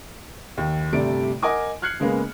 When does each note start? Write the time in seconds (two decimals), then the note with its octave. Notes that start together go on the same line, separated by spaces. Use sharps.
0.58 D#2
0.93 G1 C3 G3 A3 D5 D7
1.42 A#4 D#5 F#5 G#5 D6 D#6
1.82 F6 F#6 G#6 C7 C#7 F#7
2.00 C#3 G#3 A#3 B3